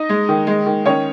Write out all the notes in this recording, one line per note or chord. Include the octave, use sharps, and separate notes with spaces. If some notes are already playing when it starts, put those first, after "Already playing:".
Already playing: D#4 D#5
G#3
D#3
G#3
D#3
D#3 C#4 C#5